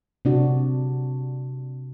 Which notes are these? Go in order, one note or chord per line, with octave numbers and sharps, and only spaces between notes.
C3 D4 F#4